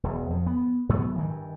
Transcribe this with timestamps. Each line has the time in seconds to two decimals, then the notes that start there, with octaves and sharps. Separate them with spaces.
0.03 E1 E2
0.30 F2
0.46 B3
0.89 G#2 F#3 A3 B3
1.16 G2 D#3 E3